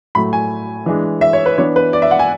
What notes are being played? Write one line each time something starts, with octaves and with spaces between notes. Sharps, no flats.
A2 F#3 A3 B5
G#5
E3 G#3 D4
E5
C#5
B4
E3 B3 D4 C#5
B4
D5
E5
F#5
G#5